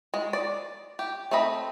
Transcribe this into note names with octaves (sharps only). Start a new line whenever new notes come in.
G#3
D5
G4
A3 C4 D#5 B5